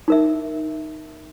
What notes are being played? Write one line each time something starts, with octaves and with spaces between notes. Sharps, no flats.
D#4 A#4 E5